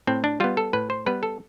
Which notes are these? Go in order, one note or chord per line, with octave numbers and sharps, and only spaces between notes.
A2 C4
D4
G3 B3 F4
A4
A2 B4
C5
G3 B3 B4
A4